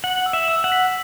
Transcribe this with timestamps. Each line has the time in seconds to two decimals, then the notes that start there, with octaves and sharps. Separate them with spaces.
0.04 F#5 F#7
0.26 E6
0.33 E5
0.48 E6
0.64 F#5
0.72 B6